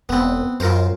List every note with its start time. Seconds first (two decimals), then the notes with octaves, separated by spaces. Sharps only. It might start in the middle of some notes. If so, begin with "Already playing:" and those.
0.09 E1 B3 C4
0.60 F#2 F4 A#4 C5